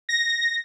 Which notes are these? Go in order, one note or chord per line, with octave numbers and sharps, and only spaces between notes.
A#6